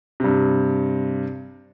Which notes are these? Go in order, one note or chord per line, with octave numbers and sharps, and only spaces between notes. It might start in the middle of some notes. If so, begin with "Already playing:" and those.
G2 C3